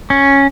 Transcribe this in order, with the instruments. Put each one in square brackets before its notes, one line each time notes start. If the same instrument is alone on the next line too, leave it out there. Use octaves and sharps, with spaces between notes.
[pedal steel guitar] C#4